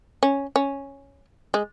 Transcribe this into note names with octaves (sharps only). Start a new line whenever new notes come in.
C#4
C#4
G#3